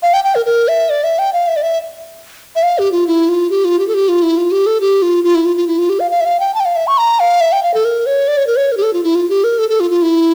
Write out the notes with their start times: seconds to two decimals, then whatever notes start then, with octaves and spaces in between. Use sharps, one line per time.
0.03 F5
0.14 G5
0.24 G5
0.35 A#4
0.46 A#4
0.68 E5
0.90 D5
1.04 E5
1.19 G5
1.33 F5
1.48 E5
1.56 D5
1.62 E5
2.56 E5
2.63 F5
2.78 G4
2.92 F4
3.07 E4
3.29 F4
3.50 G4
3.65 F4
3.79 G4
3.88 A4
3.94 G4
4.08 F4
4.23 E4
4.37 F4
4.52 G4
4.66 A4
4.81 G4
5.02 F4
5.24 F4
5.35 E4
5.45 F4
5.57 F4
5.67 E4
5.79 F4
5.89 G4
6.00 F5
6.11 F5
6.20 E5
6.25 F5
6.40 G5
6.54 A5
6.60 G5
6.65 F5
6.76 E5
6.87 C#6
6.98 A#5
7.20 F5
7.41 E5
7.52 G5
7.63 F5
7.74 A4
7.85 A#4
8.06 C#5
8.28 D5
8.37 C#5
8.47 A#4
8.56 C#5
8.72 A#4
8.77 G4
8.83 A4
8.93 F4
9.04 E4
9.15 F4
9.29 G4
9.44 A#4
9.58 A4
9.70 A4
9.80 F4
9.91 F4
10.02 E4